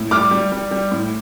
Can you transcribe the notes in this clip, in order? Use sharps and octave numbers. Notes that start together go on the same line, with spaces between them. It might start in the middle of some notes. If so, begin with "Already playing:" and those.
Already playing: A2
G3 D6 F6
G3
G3
G3
A2